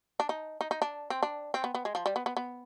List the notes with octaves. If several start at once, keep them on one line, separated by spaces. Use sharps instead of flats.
D4
D#4
D#4
D#4
D4
C4
D4
C4
B3
B3
G#3
F3
G3
B3
B3
B3